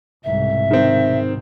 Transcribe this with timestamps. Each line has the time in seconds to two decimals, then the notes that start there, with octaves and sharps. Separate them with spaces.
0.24 C2 G#2 B2 E5
0.71 D#3 C4